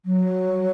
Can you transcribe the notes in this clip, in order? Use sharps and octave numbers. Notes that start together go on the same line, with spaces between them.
F#3